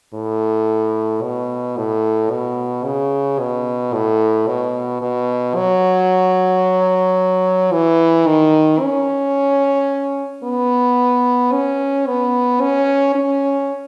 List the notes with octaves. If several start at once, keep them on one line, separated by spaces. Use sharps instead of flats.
A2
B2
A2
B2
C#3
B2
A2
B2
B2
F#3
E3
D#3
C#4
B3
C#4
B3
C#4
C#4